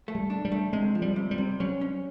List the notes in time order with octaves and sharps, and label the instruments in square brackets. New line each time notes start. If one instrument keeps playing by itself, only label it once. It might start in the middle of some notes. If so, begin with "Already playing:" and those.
[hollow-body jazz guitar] A3
[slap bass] G3
[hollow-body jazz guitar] D4
[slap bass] G3
[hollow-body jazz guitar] A3
[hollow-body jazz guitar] C3 [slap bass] G#3
[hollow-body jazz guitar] F3
[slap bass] G3
[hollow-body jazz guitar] C3
[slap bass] G3
[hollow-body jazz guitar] C3
[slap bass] F#3 [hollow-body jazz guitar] C#4
[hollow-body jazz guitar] C#4